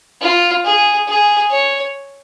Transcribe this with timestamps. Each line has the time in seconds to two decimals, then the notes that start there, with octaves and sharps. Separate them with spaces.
0.21 F4
0.64 G#4
1.08 G#4
1.51 C#5